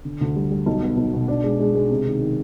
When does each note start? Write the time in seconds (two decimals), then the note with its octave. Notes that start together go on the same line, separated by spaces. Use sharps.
0.05 D3
0.21 D2
0.36 G3
0.51 G3
0.66 B1
0.82 B3
0.97 B1
1.13 B2
1.28 D4
1.44 G#3
1.59 G#3
1.75 G#3
1.90 C3
2.05 D#3
2.22 D#3